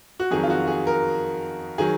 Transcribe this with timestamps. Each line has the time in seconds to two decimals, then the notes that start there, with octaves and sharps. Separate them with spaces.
0.20 F#4
0.31 F2 D#3 F#3 G#4
0.43 F4
0.50 F#4
0.67 G#4
0.87 A#4
1.78 D#3 F#3 G#4